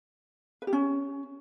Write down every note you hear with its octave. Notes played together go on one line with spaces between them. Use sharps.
B4
G4
C#4